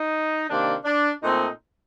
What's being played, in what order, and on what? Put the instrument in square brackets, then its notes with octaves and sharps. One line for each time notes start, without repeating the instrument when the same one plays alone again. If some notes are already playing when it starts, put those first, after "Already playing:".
Already playing: [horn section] D#4
C3 D#3 A#3 D4
D4
A#2 A3 C4 D#4